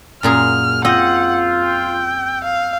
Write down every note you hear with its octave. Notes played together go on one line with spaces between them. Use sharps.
F#2 A#2 G#4 F6
C4 F4 D#5 F#5 E6 G6
G5
F5